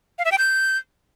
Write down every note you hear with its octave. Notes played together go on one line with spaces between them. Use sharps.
F5
E5
G5
G6